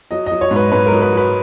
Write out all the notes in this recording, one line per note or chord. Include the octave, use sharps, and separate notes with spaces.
F#3 D#5
D#5
F#3
C#5
G#2
B4
G#2 B4
A#4
F#3
B4
F#3 B4